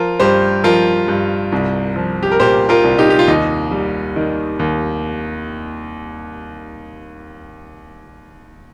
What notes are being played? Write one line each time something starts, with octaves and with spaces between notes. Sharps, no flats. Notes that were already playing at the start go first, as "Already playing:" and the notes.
Already playing: F3 F4 A#4
G2 G4 C5
F3 F4 A#4
G2
C2
F3
G4
A#4
A#2 G4 C5
F4 A#4
C2
D#4 G4
G4
F4
D#2 D#4
G3
D#3
D#2